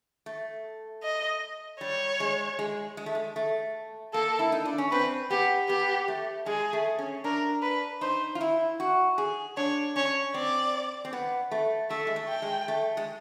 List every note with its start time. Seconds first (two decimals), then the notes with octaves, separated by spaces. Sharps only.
0.26 A3
1.03 D#5
1.80 G3 C#5
2.20 G#3
2.59 G#3
2.97 G#3
3.06 A3
3.15 G#3
3.36 A3
4.14 A#3 A4
4.39 E4
4.52 D#4
4.65 D4
4.78 C#4
4.91 C4 B4
5.31 B3 G4
5.69 B3 G4
6.08 A3
6.46 G#3 G#4
6.73 A3
6.99 C#4
7.24 D4 A#4
7.62 B4
8.01 D#4 C5
8.35 F4
8.41 E4
8.80 F#4
9.18 G#4
9.57 D4 C#5
9.96 C#4 C#5
10.34 C4 D5
11.05 C4
11.13 B3
11.51 A3
11.90 A3 E5
12.07 G#3
12.16 A3
12.29 G5
12.42 G#3
12.68 A3
12.97 G#3